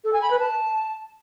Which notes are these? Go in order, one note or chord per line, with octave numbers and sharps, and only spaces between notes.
A4
G#5
B5
B4
A5